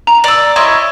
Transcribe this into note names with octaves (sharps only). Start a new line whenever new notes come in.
A#5
D5 E6
E4 C#5 D#5 C6